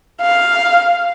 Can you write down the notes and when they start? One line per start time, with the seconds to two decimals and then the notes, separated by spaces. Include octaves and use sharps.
0.22 F5